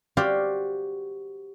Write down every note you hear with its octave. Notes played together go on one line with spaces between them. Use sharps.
F#4 G4 C5 D5 F5